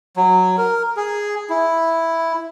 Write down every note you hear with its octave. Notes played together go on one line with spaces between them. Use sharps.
F#3
A#4
G#4
E4